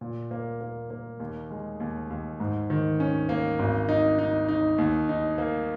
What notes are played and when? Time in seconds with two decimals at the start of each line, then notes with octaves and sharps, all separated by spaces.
0.01 A#2
0.31 A#3
0.61 A#3
0.90 A#3
1.20 D#2
1.51 G#3
1.80 D#2
2.10 D#2
2.40 G#2
2.70 D#3
3.00 C#4
3.29 A#3
3.59 G#1
3.89 D#4
4.19 D#4
4.49 D#4
4.78 D#2
5.09 D#4
5.38 A#3